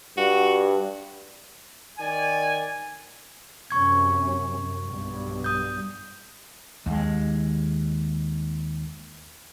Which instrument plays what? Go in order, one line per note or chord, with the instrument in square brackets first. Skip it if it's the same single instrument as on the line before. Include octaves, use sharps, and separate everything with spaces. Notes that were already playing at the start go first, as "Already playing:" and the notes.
[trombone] G2 [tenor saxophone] F#4
[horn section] D#3 D5 G#5
[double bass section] F#2 C3 C#4 [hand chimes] C#6 G#6
[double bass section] F#2
B1 G2 G3
[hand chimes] D#6 G6
[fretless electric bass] D#2 G#3